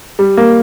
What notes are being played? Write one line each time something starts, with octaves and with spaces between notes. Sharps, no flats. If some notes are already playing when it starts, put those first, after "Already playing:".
G3
A#3